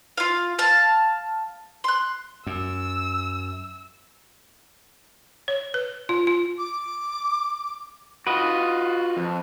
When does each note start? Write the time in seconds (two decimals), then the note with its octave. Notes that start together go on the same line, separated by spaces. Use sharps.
0.17 F4 F5
0.59 F5 A5
1.84 C6 F#6
2.47 F#2 E6
5.48 C#5
5.74 B4
6.09 F4
6.27 F4
6.58 D6
8.27 F4 F#4 B4 D#5
9.17 F2